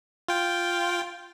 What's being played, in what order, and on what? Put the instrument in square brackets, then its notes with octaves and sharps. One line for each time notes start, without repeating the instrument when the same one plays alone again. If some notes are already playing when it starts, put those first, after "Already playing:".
[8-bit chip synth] F4 G5